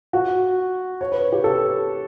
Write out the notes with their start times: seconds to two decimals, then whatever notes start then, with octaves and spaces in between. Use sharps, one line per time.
0.13 F#4
1.01 C#5
1.12 B4
1.32 G4
1.44 A4